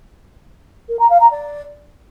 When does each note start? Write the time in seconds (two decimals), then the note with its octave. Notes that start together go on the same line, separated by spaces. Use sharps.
0.89 A#4
0.99 A#5
1.10 F5
1.20 A#5
1.31 D5